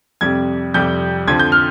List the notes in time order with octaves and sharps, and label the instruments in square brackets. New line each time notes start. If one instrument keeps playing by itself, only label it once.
[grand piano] F2 C3 G3 G#6
F2 C3 G3 G6
F2 D3 F3 G#6
G6
F6